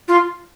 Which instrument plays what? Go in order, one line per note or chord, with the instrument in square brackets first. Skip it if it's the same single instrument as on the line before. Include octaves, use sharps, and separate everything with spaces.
[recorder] F4